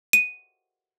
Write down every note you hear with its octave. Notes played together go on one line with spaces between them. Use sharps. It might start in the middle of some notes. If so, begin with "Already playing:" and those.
D#7